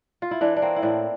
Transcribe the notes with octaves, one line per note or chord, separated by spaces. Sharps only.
F4
E4
E3 D4
D4
A#3 C4
E4
A2 D4